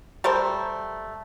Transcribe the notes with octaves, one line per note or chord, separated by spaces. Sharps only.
G3 A3 A#4 C5